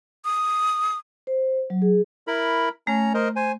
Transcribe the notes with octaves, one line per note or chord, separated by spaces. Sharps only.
D#6
C5
F#3
G#4
E4 A#4 B5
A3 C#4 A#5
A#4 C5 D#5
C5 G#5